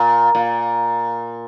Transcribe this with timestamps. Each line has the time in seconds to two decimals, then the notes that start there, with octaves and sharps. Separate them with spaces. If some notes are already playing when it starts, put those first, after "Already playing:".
Already playing: A#2
0.35 A#2